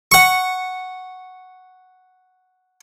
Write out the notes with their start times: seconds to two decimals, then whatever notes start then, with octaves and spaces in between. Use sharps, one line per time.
0.12 F#5 C#6